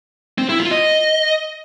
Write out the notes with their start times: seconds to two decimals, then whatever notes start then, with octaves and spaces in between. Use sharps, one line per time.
0.38 C4
0.49 E4
0.60 F4
0.71 D#5